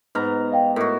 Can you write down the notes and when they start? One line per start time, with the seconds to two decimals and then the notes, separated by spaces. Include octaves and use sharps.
0.15 G#2 B3 D#4 A#5 F6
0.52 D#5 F5 G5
0.76 A2 F#4 A#4 D#5